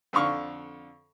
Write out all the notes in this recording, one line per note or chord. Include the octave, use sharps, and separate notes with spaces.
F2 D3 F5 C#6 F6